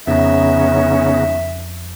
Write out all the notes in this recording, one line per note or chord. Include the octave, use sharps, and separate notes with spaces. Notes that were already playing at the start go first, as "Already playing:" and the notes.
F2 C#3 B3 C#4 D#4 E5